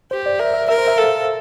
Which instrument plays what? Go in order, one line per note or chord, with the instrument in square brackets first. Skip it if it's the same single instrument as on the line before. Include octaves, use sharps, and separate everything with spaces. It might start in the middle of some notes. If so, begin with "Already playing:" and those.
[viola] G4 [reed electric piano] C5
[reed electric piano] D5
[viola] A#4 [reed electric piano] E5
[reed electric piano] E5
[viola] A#4 [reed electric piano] E5
[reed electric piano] C5
E5
[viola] A4 [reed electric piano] F5